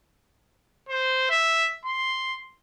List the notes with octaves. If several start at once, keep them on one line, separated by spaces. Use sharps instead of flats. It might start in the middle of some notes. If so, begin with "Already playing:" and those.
C5
E5
C6